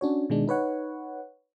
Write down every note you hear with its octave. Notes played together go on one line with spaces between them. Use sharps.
C#4 D4 F#4 C#5
B2 D#3 G#3 D4
D#4 B4 C#5 F#5